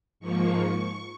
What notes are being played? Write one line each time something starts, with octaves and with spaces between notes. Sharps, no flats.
G#2 F3 A#3 C#6